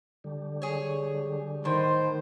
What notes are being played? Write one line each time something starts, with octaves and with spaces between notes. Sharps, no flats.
D3 G3
G#4 C#5
A2 D#3 C5